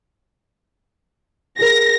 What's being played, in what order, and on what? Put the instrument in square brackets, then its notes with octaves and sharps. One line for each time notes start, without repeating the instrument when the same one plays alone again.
[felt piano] G#4 A#4 [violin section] A#6